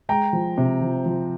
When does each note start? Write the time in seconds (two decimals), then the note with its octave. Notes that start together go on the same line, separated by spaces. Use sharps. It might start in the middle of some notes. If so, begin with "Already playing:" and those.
0.09 G#3 G5 A#5
0.33 F3
0.58 C3
0.82 F3
1.06 F3